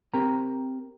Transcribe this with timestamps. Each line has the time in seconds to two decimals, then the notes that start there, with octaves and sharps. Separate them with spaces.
0.14 C4 G4 A#4 A#5